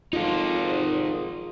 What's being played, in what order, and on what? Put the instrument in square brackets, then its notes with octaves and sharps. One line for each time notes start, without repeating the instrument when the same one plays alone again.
[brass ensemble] G#1 [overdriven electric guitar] D#4 A4 [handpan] F4